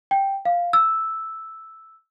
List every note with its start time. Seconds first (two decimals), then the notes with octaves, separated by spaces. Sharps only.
0.11 G5
0.45 F5
0.73 E6